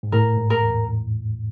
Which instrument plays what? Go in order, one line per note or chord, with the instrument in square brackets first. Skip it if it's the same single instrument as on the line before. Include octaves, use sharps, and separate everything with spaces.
[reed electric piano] G#2
[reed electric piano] A2 [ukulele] A#4
[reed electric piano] G#2
[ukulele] A#4
[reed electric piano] E2